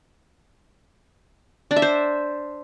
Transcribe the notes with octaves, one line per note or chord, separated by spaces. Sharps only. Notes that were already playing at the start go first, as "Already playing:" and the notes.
D4
E5
C5